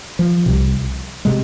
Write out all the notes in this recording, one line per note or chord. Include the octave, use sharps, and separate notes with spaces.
F3
C2 C3
C3 G#3